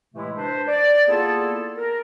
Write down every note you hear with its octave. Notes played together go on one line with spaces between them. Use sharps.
A2 C3 E3 G#3 A3 E4
D4 B4 C5
D5
A#3 B3 E4 F4 G#4 A4
A#4